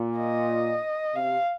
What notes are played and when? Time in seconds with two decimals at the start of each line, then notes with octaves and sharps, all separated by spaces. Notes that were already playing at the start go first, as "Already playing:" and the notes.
Already playing: A#2
0.18 D#5
1.15 C3 F5